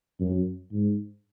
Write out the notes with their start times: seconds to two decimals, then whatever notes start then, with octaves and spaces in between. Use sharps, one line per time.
0.20 F#2
0.72 G#2